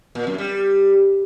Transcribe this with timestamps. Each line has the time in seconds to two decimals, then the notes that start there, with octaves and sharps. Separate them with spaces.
0.15 A#2
0.27 F#2
0.38 G3